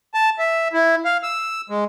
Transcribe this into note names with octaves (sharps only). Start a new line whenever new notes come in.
A5
E5
E4
F5
E6
G#3